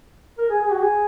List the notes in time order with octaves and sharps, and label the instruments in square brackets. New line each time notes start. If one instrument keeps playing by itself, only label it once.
[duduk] A#4
G#4
G#4
F#4
G#4